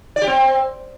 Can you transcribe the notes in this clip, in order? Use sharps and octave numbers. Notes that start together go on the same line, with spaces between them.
D5
G4
C4